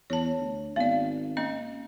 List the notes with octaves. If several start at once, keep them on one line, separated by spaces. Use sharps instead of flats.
E2 C#5 A5
D2
G#1 B3 D5 F5
A#3 C#4 D#5